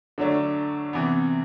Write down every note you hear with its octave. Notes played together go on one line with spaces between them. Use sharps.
D3 F#3 A3 D4
C3 E3 B3